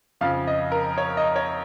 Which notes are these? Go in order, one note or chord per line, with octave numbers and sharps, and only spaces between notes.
F2 C#3 F3 F5
D#5
A#4
C#5
D#5
C#5